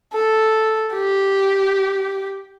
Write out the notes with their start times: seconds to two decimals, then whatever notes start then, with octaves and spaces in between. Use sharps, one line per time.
0.13 A4
0.94 G4